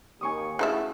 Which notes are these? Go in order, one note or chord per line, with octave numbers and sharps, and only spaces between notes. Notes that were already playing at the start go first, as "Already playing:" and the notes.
D#2 G#5 C#6 D#6
C#3 A3 D#4 E4 F#4 G#4 E5